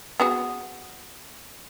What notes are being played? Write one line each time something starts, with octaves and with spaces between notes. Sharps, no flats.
B3 F#4 G#4